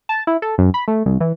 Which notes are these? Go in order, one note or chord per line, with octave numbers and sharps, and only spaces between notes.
A5
E4
A4
F#2
B5
A3
C2
E3